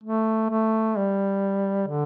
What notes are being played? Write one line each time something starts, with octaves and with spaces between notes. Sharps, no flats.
A3
A3
G3
D3